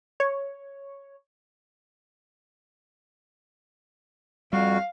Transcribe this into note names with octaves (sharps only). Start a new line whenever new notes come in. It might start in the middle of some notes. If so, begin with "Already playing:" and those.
C#5
F2 G3 F#4 F5